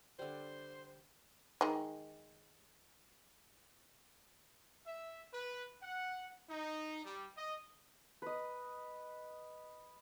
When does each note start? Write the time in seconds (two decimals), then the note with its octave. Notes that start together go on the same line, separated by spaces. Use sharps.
0.19 D3 G3 C5
1.61 D#3 G#3
4.87 E5
5.33 B4
5.83 F#5
6.50 D#4
7.05 G3
7.37 D#5
8.22 B4 D#5